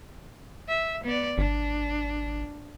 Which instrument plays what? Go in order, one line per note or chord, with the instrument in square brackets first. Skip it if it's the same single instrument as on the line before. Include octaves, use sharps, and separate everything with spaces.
[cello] E5
B3 D5
[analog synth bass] G#1 [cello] D4